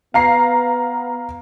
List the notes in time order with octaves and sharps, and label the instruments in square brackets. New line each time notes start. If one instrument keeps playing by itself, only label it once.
[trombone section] B3 [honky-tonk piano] F5 A#5 C7